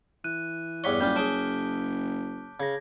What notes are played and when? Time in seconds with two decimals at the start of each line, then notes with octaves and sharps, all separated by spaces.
0.24 E3 F#6 D#7
0.84 E2 G2 C#5 D6 B6 G7
1.01 F#1 G3 F4 G6
1.16 C#4 G#4 A5 D7 G7
2.60 C#3 G#6 A#6